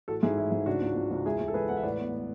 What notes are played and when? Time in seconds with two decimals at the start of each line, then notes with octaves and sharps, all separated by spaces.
0.08 A1 F#4 A4
0.23 G#2 E4 G#4
0.38 A1 E4
0.52 G#2
0.66 C#3 D4 F#4
0.82 C#2
0.95 C#2
1.11 C#2
1.25 E1 E4 G#4
1.40 E1
1.48 A4
1.54 E1 G#4 B4
1.69 E1 F#5
1.77 E5
1.83 A1 B4 D5
1.98 B3
2.13 B3